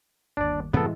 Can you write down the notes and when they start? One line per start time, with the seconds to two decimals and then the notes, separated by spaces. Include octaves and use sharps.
0.37 G1 D#2 D4 D5
0.73 F#2 A2 C3 E3 G#3 B3 C4 A4